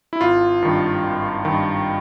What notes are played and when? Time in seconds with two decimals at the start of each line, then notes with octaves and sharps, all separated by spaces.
0.13 E4
0.21 G#1 F4
0.62 G2 D#3
1.04 G#1
1.45 G2 D#3